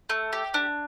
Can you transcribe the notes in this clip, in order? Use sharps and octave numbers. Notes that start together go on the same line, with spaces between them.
A3
G4
D4